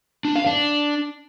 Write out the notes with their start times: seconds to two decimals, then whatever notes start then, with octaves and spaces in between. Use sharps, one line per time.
0.25 D4
0.36 F5
0.46 D4